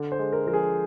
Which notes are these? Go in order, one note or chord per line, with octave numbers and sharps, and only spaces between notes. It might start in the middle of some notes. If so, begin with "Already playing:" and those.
Already playing: D3
C5
G#3
A#4
F3 A#4
G#4